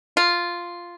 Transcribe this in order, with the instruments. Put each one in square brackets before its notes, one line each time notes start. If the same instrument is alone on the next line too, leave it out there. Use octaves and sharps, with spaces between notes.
[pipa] F4